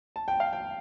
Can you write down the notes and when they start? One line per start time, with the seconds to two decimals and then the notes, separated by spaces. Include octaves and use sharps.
0.16 A5
0.28 G5
0.40 F5
0.53 G5